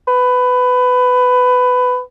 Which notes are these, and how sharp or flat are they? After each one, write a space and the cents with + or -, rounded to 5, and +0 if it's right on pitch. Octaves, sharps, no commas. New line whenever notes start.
B4 +20